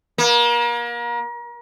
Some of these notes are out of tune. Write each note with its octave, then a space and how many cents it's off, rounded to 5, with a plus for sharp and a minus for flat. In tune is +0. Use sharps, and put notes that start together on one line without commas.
A#3 +35